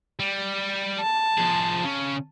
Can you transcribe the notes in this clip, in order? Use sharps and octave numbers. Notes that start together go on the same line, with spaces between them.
G3
A5
F3 G#4
C#3 C#4